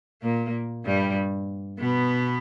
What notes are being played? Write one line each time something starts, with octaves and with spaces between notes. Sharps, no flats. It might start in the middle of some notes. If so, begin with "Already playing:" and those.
A#2 A#3
G2 G3
B2 B3